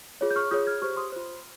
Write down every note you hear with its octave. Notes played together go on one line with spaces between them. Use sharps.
F4 G#4 C#5
G6
C#6 F6
F4 G#4 C#5 D#6 G6
F6 G#6
G4 C5 C#6 F6
C6 D#6
F4 C5